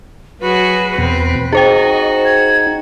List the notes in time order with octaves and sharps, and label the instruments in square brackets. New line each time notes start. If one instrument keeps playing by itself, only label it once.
[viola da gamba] F#3 F#4 G#4 [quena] B4
[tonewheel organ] E2 B2 [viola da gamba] C4
[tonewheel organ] D#4 [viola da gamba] F#4 [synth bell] G#4 C5 G5 [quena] D#5
[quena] G#6